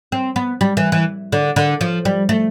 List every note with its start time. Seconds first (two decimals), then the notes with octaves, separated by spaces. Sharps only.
0.12 C4
0.36 B3
0.61 G3
0.77 E3
0.92 E3
1.32 D3
1.56 D3
1.81 F3
2.05 G3
2.29 A3